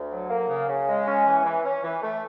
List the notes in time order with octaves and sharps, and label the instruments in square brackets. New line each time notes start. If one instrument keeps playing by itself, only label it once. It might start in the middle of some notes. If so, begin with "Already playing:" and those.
Already playing: [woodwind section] D2
F#3
A#3
C#3
C#3
G#3
C#4
E3
E3
C#4
E3
A3